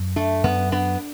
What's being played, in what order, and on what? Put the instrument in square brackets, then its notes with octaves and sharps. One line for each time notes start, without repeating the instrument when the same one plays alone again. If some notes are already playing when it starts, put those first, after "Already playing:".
Already playing: [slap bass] F#2
[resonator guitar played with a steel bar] A3 [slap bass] D4
[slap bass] F#2 [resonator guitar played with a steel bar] B3
[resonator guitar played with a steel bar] B3 [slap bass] D4